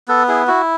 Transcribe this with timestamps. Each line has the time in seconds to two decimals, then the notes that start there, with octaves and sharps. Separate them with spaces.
0.08 B3 A4
0.28 E4 G#4
0.48 E4 F#4